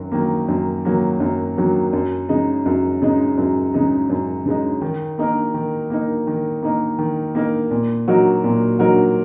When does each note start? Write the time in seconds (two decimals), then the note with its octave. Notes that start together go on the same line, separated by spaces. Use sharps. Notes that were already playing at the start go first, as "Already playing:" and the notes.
Already playing: F#2 D#3 F#3
0.12 D#3 F#3 A#3
0.48 F#2
0.85 D#3 F#3 A#3
1.20 F#2
1.57 D#3 F#3 A#3
1.93 F#2
2.29 C#3 G#3 D#4
2.66 F#2
3.02 C#3 G#3 D#4
3.38 F#2
3.74 C#3 G#3 D#4
4.10 F#2
4.46 C#3 G#3 D#4
4.81 D#3
5.18 A#3 D#4 A#4
5.54 D#3
5.90 A#3 D#4 A#4
6.27 D#3
6.62 A#3 D#4 A#4
6.99 D#3
7.35 A#3 D#4 A#4
7.71 A#2
8.08 F#3 D#4 F#4 A#4
8.44 A#2
8.79 F#3 D#4 F#4 A#4